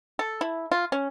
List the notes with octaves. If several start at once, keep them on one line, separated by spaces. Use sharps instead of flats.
A4
E4
F4
C#4